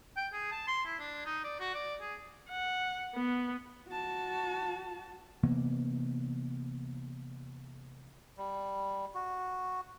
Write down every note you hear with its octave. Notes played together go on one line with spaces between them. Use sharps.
G5
G#4
A5
C6
E4
D4
D#4
D5
F#4
D5
G#4
F#5
B3
F#4 A5
C3 E3 A#3 B3
G3
F#4